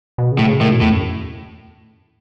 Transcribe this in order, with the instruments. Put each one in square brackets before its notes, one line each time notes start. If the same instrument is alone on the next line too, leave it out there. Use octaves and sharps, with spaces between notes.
[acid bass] B2
C#3
[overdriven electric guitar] A2
[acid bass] C#3
[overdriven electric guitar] A2 [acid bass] D#3
[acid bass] B2
[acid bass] E2 [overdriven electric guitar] A2
[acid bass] F#2